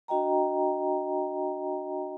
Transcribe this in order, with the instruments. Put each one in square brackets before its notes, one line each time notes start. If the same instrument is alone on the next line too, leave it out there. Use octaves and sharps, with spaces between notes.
[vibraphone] D4 F#4 D#5 G5 A#5